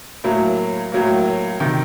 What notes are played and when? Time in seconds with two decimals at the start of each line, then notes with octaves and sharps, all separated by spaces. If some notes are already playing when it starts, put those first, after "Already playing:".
0.24 A2 F#3 A#3
0.92 A2 F#3 A#3
1.60 C3 D#3